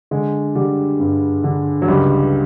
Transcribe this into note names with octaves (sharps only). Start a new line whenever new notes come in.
D3 G#3
D3 G3
G2
D3
F#3
C#2 G3